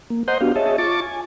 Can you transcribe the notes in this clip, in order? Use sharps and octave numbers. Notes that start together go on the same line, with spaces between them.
A#3
C5 D#5 F#5 A#5 C6 G6
B3 D4 F#4 G4 F5
G#4 C#5 D#5 E5 A5
F4 A5 C#6 D6 A6
G#5